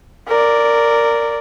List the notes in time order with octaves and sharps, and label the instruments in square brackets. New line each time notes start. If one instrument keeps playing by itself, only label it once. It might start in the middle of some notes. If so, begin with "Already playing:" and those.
[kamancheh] A#4 D5